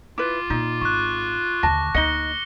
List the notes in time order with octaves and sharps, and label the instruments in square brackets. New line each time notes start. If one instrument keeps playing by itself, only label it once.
[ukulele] E4 B4 [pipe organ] F4 [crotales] D6
[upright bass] A#2 [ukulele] D#4
[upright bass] G#1 [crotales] C#6 F#6
[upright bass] D#2 D3 [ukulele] A5 [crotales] A#6
[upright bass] D2 A#3 [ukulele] D#4 D#5 [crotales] C#7 G7